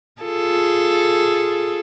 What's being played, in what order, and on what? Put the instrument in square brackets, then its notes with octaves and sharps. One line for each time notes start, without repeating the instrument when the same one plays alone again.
[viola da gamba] F4 G#4 A4